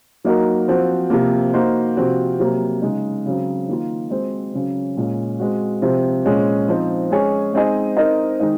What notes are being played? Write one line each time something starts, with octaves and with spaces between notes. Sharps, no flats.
F#3 A#3 D#4 F#4 A#4
F3 C4 F#4
C3 F3 A#3
A#3 D#4 F#4 C5
C3 F3 C4 F#4
C3 F#3 A#3
C#3 G#3 D#4
C#3 F#3 C4
D#3 A#3 F4
G#3 C4 F#4 C5
C#3 F#3 C#4
A#2 G#3 C#4
G#3 C4 F#4
C3 F3 C4
A#2 G#3 C#4 G#4 C5
F3 C4 D#4
G#3 C#4 G#4 C#5
G#3 C4 D#4 G#4 D#5
C4 D#4 A#4 D#5
D#3 G#3 D#4